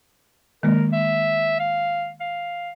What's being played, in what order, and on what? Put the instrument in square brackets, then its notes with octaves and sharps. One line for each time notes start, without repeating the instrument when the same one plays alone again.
[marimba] D#3 G#3 A#3 [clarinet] A#4
[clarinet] E5
F5
F5